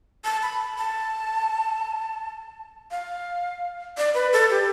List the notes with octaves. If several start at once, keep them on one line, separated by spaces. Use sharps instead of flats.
A5
B5
A5
F5
D5
B4
A4
G4